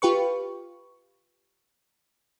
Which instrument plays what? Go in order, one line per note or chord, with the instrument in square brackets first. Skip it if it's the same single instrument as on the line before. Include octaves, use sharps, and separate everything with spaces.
[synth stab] F4 G4 B4 C#6